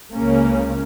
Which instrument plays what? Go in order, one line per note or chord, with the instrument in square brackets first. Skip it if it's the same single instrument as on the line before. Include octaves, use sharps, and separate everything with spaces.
[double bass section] C#2 C#3 A#3 C#4